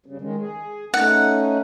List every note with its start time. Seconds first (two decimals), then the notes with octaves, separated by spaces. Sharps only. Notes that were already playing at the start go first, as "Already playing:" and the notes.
0.06 G2 C#3
0.21 D#3 G#3
0.39 G#4
0.94 A3 C#4 D#4 F#5